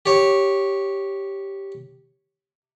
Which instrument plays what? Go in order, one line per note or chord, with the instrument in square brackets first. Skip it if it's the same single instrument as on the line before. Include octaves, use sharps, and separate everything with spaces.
[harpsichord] G4 C#5